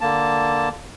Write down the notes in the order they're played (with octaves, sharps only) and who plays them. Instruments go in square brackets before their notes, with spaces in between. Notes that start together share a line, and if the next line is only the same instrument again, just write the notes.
[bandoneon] D3 A#3 A5